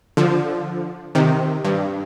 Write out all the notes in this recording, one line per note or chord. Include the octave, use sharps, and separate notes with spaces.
D3 F3
C3 D#3
G2